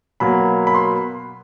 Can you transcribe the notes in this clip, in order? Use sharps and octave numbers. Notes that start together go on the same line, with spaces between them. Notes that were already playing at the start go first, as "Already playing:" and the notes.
B2 F#3 A#3 B5
B5
C6